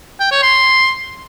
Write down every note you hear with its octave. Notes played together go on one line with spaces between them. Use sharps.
G5
C#5
C6